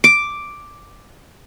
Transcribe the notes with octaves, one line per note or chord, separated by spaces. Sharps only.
D6